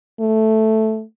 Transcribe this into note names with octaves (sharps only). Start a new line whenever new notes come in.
A3